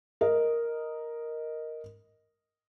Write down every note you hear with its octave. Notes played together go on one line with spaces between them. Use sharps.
A#4 D#5